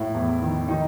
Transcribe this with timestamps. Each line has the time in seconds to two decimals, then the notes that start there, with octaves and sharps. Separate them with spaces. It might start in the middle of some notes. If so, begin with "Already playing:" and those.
Already playing: A2 E4
0.14 E2
0.42 D#3
0.68 D#3 D#4